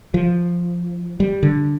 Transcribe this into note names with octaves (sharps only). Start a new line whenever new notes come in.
F3
G3
D3